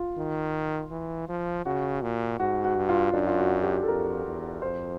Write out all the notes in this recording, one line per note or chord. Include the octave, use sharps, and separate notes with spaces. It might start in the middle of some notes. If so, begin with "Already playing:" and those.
Already playing: F4
D#3
E3
F3
C#3 F#4
A#2
G#2 F#4
F#4
G2
F4
F#2 D4
F4
F#4
G4
A4
F2 A#4
E2
F2 C5